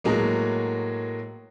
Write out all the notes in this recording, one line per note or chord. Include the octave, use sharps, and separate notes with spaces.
A2 F#3 G#3 A#3 B3